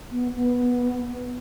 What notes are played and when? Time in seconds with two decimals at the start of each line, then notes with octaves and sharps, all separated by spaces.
0.11 B3
0.35 B3